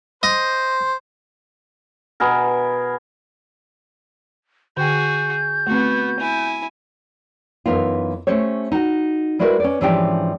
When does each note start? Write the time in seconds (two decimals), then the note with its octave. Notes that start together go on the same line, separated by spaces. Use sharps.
0.23 C5 D#5
2.20 B2 G#4 A#4
4.77 D3 F#4 G#4 G5 G6
5.67 A3 B3 C4 F#4
6.19 E4 G#5
7.66 F#2 E3 B3 D#4 F4
8.27 A3 C#4 G4 C5 C#5
8.72 D#4 F#4
9.39 G3 G#3 E4 F#4 A#4 B4
9.60 C#4 B4 D5
9.81 G#2 E3 F3 C#4 D4 G4